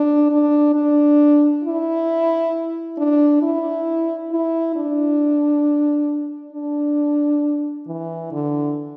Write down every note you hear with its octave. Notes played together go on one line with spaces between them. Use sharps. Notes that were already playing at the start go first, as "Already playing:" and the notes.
Already playing: D4
D4
D4
E4
D4
E4
E4
D4
D4
E3
D3